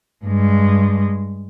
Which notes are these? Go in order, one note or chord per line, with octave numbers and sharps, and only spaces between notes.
G2 G#3